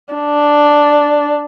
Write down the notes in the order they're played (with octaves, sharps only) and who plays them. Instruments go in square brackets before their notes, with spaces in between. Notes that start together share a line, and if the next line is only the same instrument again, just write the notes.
[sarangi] D4